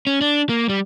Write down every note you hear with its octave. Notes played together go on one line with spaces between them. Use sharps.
C#4
D4
A#3
G3